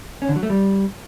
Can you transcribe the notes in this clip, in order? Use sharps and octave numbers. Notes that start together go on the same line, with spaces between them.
C#4
D3
F#3
A3
G3